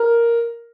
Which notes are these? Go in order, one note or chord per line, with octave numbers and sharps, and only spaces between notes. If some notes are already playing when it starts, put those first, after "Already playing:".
Already playing: A#4